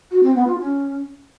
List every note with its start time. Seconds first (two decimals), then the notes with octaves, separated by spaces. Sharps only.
0.11 F#4
0.23 C4
0.35 B3
0.47 F4
0.59 C#4